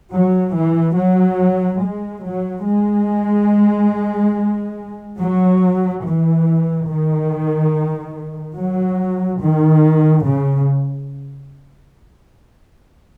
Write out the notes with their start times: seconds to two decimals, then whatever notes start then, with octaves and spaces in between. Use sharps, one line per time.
0.12 F#3
0.54 E3
0.96 F#3
1.81 G#3
2.23 F#3
2.65 G#3
5.18 F#3
6.04 E3
6.87 D#3
8.56 F#3
9.41 D#3
10.25 C#3